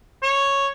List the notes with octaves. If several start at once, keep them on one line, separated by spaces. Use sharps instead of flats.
C#5